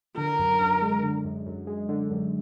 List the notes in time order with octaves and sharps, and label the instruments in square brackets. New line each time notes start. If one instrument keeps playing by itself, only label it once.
[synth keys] D3 [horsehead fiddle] A#4
[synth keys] F#2
F#2
G#3
D3
F#2
F#2
G#3
D3
F#2